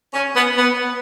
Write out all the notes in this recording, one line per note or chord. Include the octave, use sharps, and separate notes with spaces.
C#4
B3
B3